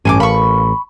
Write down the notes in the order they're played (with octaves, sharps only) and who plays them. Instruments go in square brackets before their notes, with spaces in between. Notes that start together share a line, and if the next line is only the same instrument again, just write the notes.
[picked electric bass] A1 [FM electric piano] G2 C#4 [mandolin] G#5 C6 D6
[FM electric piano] A#4 F5 [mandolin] B5 C#6